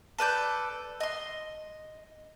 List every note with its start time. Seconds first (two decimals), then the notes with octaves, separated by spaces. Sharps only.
0.18 A4 B4 D5 G6
1.00 D#5 C6